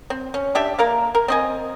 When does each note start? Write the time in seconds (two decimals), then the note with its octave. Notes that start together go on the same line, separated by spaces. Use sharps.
0.10 C4
0.34 C#4
0.55 D4 G4 E5
0.79 A#3 A#4 F5
1.15 A#4
1.28 C4 D#5 G#5